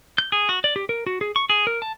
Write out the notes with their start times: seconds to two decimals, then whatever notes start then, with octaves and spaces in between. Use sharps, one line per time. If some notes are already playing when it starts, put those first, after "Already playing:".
0.18 G6
0.32 G#4
0.49 F#4
0.64 D5
0.76 G4
0.89 A#4
1.06 F#4
1.21 G#4
1.36 C#6
1.50 G#4
1.67 A#4
1.82 A5